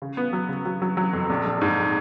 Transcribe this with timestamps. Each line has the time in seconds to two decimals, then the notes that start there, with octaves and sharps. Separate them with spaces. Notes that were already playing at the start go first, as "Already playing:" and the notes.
0.02 C#3
0.17 B3
0.33 F#3
0.49 C#3
0.65 F#3
0.82 F#3
0.97 F#3
1.13 F2
1.30 A#1
1.45 A#1
1.61 G#2